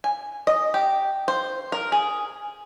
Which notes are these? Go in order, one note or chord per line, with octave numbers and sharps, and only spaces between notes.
G#5
D#5
G4
C5
A#4
G#4